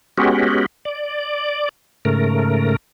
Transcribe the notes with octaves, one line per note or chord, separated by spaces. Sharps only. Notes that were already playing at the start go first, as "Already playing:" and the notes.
G#3 B3 C#4 F#4 G4
D5
G#2 C#3 A3 A#4